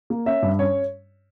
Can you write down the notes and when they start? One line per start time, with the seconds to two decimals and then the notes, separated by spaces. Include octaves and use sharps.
0.10 A#3
0.26 C#4 E5
0.43 G2
0.59 C#4 C#5